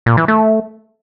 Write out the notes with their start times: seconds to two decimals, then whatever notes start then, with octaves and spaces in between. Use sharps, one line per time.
0.06 A#2
0.17 E3
0.28 A3